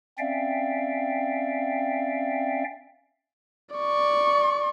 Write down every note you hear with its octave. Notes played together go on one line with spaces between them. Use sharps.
C4 C#4 D5 E5 F5 G5
D5 C#6